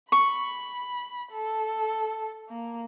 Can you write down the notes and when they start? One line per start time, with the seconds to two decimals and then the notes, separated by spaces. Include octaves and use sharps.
0.12 B5 C#6
1.32 A4
2.49 A#3